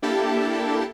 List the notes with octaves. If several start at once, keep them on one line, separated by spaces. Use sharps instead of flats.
A#3 D4 E4 G4 A4 A5